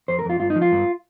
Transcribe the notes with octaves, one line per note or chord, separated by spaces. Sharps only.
F2 C5
A#4
F2 F4
G2 F4
D#4
F3
F4
G2